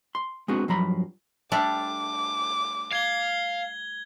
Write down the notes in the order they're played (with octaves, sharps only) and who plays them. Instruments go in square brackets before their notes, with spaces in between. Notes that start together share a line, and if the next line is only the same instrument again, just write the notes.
[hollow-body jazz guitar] C6
G#3 B3 C4 D4 F#4
G2 F3 F#3 A#5 B5
[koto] G3 A3 D4 [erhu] D6
[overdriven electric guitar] F5 [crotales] G#6 G7